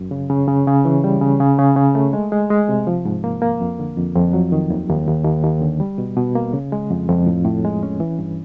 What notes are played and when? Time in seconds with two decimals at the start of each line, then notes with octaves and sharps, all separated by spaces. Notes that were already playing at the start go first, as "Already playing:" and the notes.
Already playing: F#2
0.11 C#3
0.30 C#3
0.48 C#3
0.67 C#3
0.85 E3
1.04 G3
1.21 C#3
1.40 C#3
1.59 C#3
1.76 C#3
1.95 A3
2.13 G#3
2.32 G#3
2.50 G#3
2.69 C3
2.87 F3
3.05 G#2
3.24 A#3
3.42 A#3
3.61 F2
3.79 D3
3.97 F2
4.16 F2
4.33 F#3
4.52 D#3
4.70 D#2
4.89 D#2
5.08 D#2
5.25 D#2
5.44 D#2
5.62 D3
5.80 G3
5.98 B2
6.17 B2
6.35 A#3
6.53 C#3
6.72 G#3
6.90 F2
7.09 F2
7.27 A2
7.45 A2
7.64 G#3
7.83 C#4
8.00 E3
8.19 G2